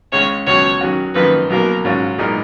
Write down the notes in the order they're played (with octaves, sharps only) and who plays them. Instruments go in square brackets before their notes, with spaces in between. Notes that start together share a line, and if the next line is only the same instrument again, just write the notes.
[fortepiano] C#2 C#3 G#3 C#4 [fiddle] C#5
[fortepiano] C#2 B2 F#3 [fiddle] C#5
[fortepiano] D#3 F#3 C#4 F#4
[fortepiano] G#1 F#2 F3 A#3 D#4 [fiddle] B4
[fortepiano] B1 B2 F#3 A#3 [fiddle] A#4
[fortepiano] G#2 F#3 C#4 F4
B1 A#2 G#3 D#4 A#4